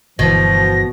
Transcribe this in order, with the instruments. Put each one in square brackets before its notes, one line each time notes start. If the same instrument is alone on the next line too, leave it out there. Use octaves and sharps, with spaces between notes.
[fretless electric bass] G1 D3 E3 [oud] B2 [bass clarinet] F3 [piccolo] A#6